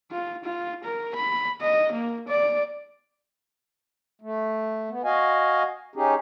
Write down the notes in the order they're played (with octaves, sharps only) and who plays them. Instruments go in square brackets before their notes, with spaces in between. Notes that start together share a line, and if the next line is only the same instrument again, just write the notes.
[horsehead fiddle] F4
F4
A#4
B5
D#5
A#3
D5
[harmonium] A3
B3
F#4 D#5 F5 G#5
C#4 D#4 G4 G#4